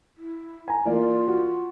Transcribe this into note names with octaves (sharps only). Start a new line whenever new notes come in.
E4
G#5 A#5
E3 A#3 F4 D5
F#4